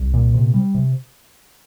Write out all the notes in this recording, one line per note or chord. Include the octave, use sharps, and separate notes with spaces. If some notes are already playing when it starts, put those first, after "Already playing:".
Already playing: C2
A#2
C3
G3
C3